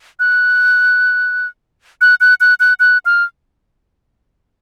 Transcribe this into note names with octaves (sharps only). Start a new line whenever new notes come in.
F#6
F#6
F#6
F#6
F#6
F#6
F6